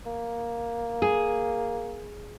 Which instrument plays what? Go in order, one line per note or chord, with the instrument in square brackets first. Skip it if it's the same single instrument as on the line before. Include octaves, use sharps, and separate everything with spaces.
[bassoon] A#3
[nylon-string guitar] G#4